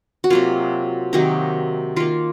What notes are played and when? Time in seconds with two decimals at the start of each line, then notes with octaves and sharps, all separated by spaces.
0.24 F#4
0.30 C3 F#3 A#3 F4
1.13 C3 D#3 F#3 A#3 D#4
1.96 D#3 A#3 F4